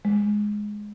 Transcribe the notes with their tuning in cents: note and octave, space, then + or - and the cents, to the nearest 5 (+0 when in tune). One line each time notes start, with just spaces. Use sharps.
G#3 +5